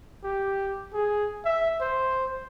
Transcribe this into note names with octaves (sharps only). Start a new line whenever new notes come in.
G4
G#4
E5
C5